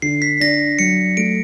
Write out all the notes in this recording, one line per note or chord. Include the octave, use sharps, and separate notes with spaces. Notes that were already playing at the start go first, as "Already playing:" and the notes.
D3 C7
B6
D4 A#6
F#3 C#7
A3 D7